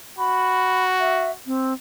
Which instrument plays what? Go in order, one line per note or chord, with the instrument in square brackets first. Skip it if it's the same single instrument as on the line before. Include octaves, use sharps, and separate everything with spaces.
[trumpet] F#4 [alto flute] B5
[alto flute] E5
C4